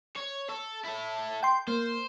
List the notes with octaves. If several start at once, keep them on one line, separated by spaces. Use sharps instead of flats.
C#5
A4
E4 A4
G5 C6
A#3 C5